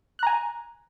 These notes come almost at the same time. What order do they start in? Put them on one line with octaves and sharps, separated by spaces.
F#6 A#5 G#5